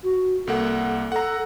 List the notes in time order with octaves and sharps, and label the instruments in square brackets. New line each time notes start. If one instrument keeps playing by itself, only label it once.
[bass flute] F#4
[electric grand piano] C2 A#3 F#5 [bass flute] A4
[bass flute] A4 [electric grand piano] F#5 A#5